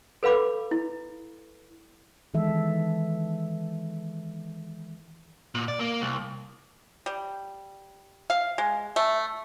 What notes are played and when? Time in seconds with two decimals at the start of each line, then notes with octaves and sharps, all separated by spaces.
0.23 A4 B4 F5 B5 D6
0.71 E4
2.34 D#3 E3 G#3 A4 E5
5.55 A#2
5.68 D5
5.79 A#3
6.02 C2
7.06 G3
8.30 F5
8.58 G#3
8.96 A3